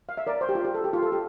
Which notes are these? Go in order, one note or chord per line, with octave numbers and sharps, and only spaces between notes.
F5
E5
A#4 D5
C5
G4
F4
G4
A4
G4
F4
A4
G4